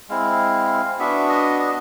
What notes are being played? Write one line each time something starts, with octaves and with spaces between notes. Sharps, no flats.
G#3 C4 E4 F5
B3 D4 F#4 E5
D#5
D#5